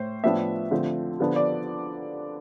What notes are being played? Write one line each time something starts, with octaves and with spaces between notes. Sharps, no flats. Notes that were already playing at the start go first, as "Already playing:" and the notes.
Already playing: A2 C5
A2 F3 B3 D4 E5
D3 F3 A3 C4
D3 F3 B3 D4
D5